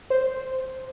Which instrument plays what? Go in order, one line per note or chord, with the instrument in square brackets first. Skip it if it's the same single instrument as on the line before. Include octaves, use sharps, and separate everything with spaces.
[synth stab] C5